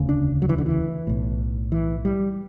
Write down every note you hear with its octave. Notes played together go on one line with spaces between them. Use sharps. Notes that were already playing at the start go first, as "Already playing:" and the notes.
Already playing: E1 D2 C#3
D4
F#3
E3
D3
E3
B1 A2
E3
G3